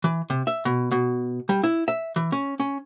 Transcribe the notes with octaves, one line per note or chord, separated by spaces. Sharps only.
E3
C3
E5
B2
B2
G3
E4
E5
E3
C#4
C#4